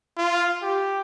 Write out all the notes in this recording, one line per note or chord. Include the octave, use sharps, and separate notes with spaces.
F4
G4